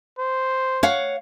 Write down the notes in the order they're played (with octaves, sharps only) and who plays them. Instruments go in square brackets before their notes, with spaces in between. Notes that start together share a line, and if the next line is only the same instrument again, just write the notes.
[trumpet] C5
[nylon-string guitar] C#5 F5 F#5